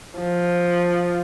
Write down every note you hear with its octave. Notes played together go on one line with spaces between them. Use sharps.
F3